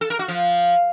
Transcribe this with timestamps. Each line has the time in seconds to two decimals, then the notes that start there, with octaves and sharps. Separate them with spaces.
0.01 A4
0.10 A#4
0.19 F#4
0.28 F3